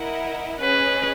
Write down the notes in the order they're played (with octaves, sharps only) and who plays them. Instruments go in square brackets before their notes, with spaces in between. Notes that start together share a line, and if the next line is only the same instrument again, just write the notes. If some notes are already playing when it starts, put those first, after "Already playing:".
Already playing: [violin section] E4 A#4 D#5 F#5
[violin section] C#4 G#4 D#5 [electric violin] B4